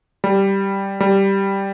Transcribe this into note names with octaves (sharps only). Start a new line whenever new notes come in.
G3
G3